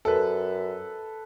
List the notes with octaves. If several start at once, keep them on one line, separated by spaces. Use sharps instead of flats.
F#2 A4 B4